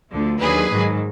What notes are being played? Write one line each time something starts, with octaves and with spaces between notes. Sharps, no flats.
D2 D3 F3
D#2 D3 F#3 G#4 B4
G#2 D#3 F#3